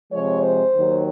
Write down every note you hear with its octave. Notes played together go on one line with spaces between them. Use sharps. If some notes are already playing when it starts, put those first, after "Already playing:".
C3 F3 G#3 C#5
C5
D#2 D#3 F#3